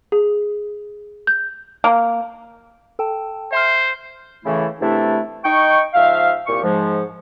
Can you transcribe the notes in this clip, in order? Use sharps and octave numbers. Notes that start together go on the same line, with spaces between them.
G#4
G6
A#3
A4 G5 A5
C5 E5 C6 F6
A2 C#3 E3 A3 E4
E2 C3 A3 D4 E4 A4
D#4 G5 C#6
G#2 F3 E5 F5
C2 A#2 G4 C#6
G#2 F3 G#3